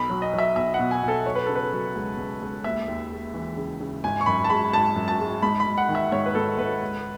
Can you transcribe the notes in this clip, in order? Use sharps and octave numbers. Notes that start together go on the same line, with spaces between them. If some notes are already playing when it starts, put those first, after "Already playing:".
Already playing: B1 B5
F#3
D#5
F#3 E5
B1 E5
F#5
B2
G#5
B2
A4
F#3 C#5
B4
C#3 A4
B4
F#3
C#2
C#2
C#2
D#2 E5
D#2
G#3
E3
C#3
C#3
G#1 G#5
C#6
F#2 B5
A5
G#3 B5
G#1 A5
F#2
A5
G#3
G#2 B5
B5
G#2
F#5
D#3
E5
G#2 C#5
B4
G#2 A4
G#2 B4
C#2